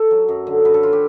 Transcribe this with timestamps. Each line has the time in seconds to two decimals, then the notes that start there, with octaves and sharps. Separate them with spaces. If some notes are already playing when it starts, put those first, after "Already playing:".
Already playing: A4
0.11 F#3
0.28 F#2
0.47 D3
0.65 F#2 B4
0.74 A4
0.83 F4
0.93 G4